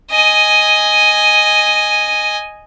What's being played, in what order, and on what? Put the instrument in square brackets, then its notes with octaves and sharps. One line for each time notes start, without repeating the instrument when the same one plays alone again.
[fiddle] D#5 G#5